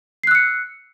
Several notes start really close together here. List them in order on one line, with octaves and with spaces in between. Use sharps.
C7 F#6 E6 C#7